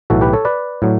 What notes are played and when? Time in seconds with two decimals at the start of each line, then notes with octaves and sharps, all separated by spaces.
0.10 B1 A2 E3 F#4 A4
0.21 G4 B4
0.33 A4 C#5
0.45 B4 D5
0.82 A2 F#3